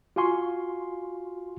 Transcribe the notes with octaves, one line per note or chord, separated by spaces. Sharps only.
F4 F#4 F5 G#5 C6 C#6